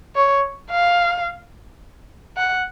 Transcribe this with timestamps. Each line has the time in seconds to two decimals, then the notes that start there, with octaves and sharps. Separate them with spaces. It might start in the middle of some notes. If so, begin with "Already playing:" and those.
0.16 C#5
0.71 F5
2.37 F#5